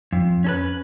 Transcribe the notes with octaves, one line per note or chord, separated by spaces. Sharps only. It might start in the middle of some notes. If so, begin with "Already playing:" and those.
F2
C#4 A4 B4